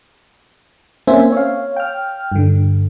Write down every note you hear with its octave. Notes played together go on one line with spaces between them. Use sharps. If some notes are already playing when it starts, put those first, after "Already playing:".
A#3 C4 C#4 C5 E5 G#5
C#5 F5
G5 F6
G2 D3